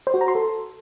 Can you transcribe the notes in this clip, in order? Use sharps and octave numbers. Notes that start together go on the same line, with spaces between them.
C5
F#4
A#5
C6
A4